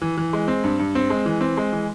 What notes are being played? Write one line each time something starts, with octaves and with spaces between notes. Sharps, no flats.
E3
E3
G#3
C4
G2
G2
C4
G#3
E3
C4
G#3
E3